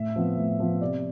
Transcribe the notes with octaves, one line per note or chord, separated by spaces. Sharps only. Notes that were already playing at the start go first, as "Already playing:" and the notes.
Already playing: A2 E5
F3 B3
A2
F3 B3
C3 D5